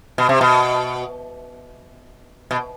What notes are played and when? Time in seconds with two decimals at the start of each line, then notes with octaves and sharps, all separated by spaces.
0.18 B2
0.29 C3
0.41 B2
2.51 B2